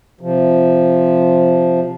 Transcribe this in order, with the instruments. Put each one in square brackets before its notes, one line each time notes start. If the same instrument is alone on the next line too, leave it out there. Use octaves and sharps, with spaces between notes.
[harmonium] C3 F3